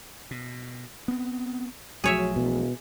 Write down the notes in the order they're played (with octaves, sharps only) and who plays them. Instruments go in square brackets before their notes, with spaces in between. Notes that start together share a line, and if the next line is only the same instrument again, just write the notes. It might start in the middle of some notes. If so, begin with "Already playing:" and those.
[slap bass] B2
B3 C4
[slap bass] B1 F3 A3 [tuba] F#3 [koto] G#4 C#5 E5
[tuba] E1 [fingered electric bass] B2